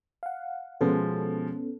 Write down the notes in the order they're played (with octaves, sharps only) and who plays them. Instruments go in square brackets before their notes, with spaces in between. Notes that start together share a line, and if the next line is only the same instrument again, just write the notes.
[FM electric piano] F5 F#5
[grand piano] B2 F3 G#3 [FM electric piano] B3 C#4 A4